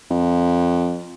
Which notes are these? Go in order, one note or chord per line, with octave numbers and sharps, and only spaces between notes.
F2